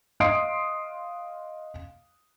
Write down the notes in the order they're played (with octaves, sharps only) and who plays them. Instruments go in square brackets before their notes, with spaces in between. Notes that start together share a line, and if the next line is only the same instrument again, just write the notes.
[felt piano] D#5 F5 C6 D#6 C7 D7